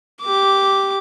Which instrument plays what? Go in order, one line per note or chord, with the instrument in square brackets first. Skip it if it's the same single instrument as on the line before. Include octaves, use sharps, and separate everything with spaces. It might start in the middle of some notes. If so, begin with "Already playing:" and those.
[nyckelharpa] G4 D6